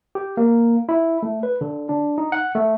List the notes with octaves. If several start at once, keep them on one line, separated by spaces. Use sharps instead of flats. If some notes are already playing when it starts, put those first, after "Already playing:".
G4
A#3
E4
A3
B4
D3
D4
D#4
F#5
A3